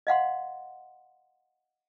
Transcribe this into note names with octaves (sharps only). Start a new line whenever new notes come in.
D#5 F5 F#5 C6